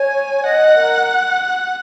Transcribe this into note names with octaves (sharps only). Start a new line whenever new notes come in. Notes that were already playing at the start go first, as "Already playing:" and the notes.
Already playing: C#5 G#5
D#5 F#5
A#4